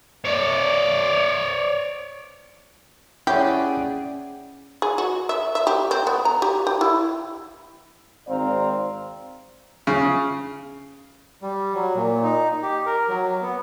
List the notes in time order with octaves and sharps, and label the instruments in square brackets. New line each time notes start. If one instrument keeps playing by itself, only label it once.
[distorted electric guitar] C#5 D5
[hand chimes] C#4 F#5 [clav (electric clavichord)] E4 C#5 G5 [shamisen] G4 [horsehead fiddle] G#4 D5
[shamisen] G#4
F#4
E5
E5
G4
C4
B3
A#5
G4
G4
E4
[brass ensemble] G#1 C4 C5 D5 F5 A#5
[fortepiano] C#3
[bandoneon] G3
F#3
A#2
D#4
G4
A#4
F#3
B3